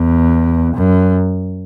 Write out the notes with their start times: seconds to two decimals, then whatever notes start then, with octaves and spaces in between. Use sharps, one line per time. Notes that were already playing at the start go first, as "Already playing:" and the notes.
Already playing: E2
0.75 F#2